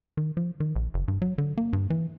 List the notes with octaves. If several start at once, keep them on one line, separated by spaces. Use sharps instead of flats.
D#3
F3
D#3
A#1
F#1
G2
F#3
D3
A#3
G2
E3